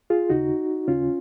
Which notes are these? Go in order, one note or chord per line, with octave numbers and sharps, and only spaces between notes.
F4 G#4
D#2 C#3 D#4 F#4
D#2 C#3 C#4 F4